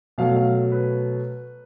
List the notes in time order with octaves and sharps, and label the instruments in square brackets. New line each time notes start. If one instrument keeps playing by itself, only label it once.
[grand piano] B2 F#3 A3 F5
F5
B4